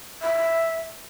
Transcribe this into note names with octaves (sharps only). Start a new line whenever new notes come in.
E5